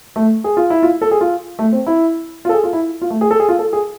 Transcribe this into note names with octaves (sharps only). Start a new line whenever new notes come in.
A3
G#4
F4
E4
F4
A4
G#4
F4
A3
C4
E4
F4
A4
G#4
F4
E4
F4
A3
G#4
A4
G#4
F4
A4
G#4